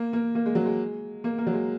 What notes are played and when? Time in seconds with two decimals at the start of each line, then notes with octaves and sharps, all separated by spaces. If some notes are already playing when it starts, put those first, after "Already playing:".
Already playing: A#3
0.13 A#3
0.35 A#3
0.46 G#3
0.55 F#3
0.66 G#3
1.24 A#3
1.38 A#3
1.47 F#3
1.53 G#3